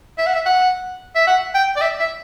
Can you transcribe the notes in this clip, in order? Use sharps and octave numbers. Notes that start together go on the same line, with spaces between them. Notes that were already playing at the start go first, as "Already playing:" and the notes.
E5
F#5
E5
F#5
E5
F#5
G5
D5
E5
E5